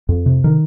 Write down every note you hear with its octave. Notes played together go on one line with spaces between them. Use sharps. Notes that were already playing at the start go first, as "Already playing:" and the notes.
F2
C3
D#3